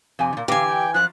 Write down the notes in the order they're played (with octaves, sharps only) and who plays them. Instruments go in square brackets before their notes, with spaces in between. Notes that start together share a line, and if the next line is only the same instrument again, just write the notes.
[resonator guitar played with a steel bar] F2 C3 G#5
A#2 D#3
[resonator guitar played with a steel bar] D3 G4 [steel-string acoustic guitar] E3 G#5 [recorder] F5
[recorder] G5
[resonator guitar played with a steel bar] F#2 F3 [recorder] F#6